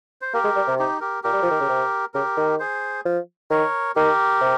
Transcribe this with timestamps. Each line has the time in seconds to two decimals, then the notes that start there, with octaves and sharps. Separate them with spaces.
0.21 C5
0.33 A#3 G4 A#4
0.44 G#3
0.56 G3
0.67 C3
0.79 D#4 G4
1.01 G4 A#4
1.23 A#2 G4 A#4
1.33 G3
1.43 F3
1.51 D#3
1.60 C#3
1.69 C3
2.14 C#3 G4 A#4
2.37 D#3
2.60 G#4 C5
3.05 F3
3.50 D#3 A#4 C#5
3.96 D#3 G4 A#4
4.41 C3